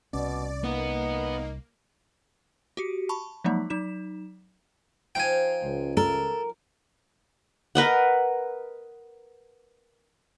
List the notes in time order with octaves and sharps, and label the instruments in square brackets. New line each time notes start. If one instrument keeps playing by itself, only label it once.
[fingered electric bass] C2 C#4 [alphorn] B2 [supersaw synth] D5
[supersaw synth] A#3 [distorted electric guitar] B3 [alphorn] D#4
[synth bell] F#4 G4 C#7
A5 B5 C#6
F3 F#3 G#3 A#3 D#4
F#3 D#4 E7
[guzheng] F3 D#4 F4 [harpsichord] G5 G#5
[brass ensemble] C#2
[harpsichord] A4 [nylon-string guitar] A#4
[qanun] A#4 B4 D#5 F#5